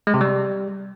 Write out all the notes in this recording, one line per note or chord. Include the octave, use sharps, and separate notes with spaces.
G#3
C3
G3